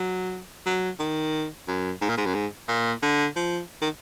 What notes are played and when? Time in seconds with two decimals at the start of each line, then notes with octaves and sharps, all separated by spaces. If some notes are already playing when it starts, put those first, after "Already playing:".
Already playing: F#3
0.66 F#3
0.99 D#3
1.68 F#2
2.01 G#2
2.09 A#2
2.17 G#2
2.26 F#2
2.35 G#2
2.69 A#2
3.03 D3
3.36 F3
3.82 D#3